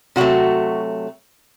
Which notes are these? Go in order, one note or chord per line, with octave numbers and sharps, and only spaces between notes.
C3 F#3 A3 F#4